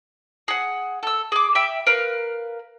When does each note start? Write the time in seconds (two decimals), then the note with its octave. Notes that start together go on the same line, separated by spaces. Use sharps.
0.48 G#4 F#5
1.03 A4 E6
1.32 G#4 D6
1.55 E5 G5 B5 E6
1.87 A#4 B4 F5